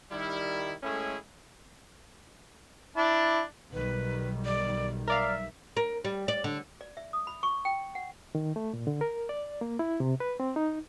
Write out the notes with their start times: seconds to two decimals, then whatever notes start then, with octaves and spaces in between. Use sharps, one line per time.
0.11 D#3 G3 E4
0.83 A2 G#3 A3 C#4 E4 G#4
2.97 D4 E4 A5
3.73 B1 D#3 G3 B4
4.45 D5
5.08 A#4 D5 E5 F5
5.77 A#4
6.05 G3
6.28 D5
6.44 D3
6.81 D5
6.97 E5
7.13 D#6
7.27 B5
7.43 C#6
7.65 G5
7.95 F#5
8.35 D#3
8.56 A3
8.74 A#2
8.87 D3
9.01 A#4
9.29 D5
9.61 A#3
9.79 E4
10.00 C3
10.20 B4
10.40 C4
10.56 D#4